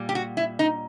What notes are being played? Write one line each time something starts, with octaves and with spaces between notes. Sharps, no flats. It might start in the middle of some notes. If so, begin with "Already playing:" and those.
Already playing: A#2 G3
G4
F#4
E4
D#4